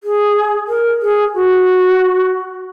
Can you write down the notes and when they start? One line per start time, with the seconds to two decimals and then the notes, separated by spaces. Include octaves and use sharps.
0.04 G#4
0.68 A#4
1.02 G#4
1.35 F#4